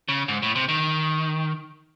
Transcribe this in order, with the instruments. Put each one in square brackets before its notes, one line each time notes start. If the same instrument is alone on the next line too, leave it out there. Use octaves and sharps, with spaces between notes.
[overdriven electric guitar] C#3
G#2
A2
C3
D#3